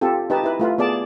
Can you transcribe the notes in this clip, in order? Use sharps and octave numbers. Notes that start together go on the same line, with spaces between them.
C4 F4 G4 A4
D#4 G4 B4 A5
E4 B4
A3 F4 B4
B3 G#4 D5 A5